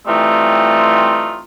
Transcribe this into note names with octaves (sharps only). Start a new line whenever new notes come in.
E3 G3 A3 C4 D#4 F4